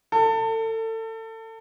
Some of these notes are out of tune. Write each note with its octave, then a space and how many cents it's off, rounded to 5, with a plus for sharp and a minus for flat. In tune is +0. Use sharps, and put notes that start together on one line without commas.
A4 +30